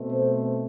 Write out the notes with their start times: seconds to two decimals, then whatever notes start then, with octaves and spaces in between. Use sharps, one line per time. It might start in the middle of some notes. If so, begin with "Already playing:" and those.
Already playing: B2 A3 C4
0.11 A4 C5